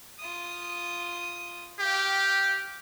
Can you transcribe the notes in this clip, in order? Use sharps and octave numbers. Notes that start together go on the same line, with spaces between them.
F4 D#6
G4 F5 G5